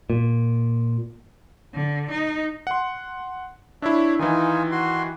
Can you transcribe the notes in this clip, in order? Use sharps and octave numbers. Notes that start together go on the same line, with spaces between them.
A#2
D3
D#4
F#5 C6
D4 E4 C#5 E5
D#3 E3 D#4 F4 G#5
F#4 C6